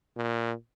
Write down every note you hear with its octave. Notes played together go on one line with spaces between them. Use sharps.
A#2